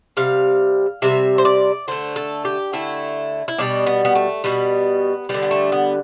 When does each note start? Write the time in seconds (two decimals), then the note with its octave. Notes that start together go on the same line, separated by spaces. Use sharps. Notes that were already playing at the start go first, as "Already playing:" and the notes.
0.17 C3 G3 F5
1.02 C3 G3 E5
1.38 C5
1.45 D5
1.88 D3 A3 C5
2.16 A4
2.45 G4
2.73 D3 A3 E4
3.48 E4
3.58 B2 G3 D4
3.87 B3
4.05 B3
4.15 A3
4.44 B2 G3 B3
5.29 G3 B3
5.34 D3
5.43 B3
5.51 A3
5.72 B3